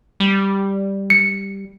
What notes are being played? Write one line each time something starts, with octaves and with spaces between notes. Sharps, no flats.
G3
C#7